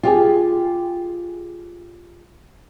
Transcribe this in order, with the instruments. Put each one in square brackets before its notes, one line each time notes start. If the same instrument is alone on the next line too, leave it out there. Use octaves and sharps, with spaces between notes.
[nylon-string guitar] F4 G4 G#4